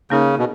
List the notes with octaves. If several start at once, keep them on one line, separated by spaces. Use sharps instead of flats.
C#3 A#3 D#4 A#4 C#5
B2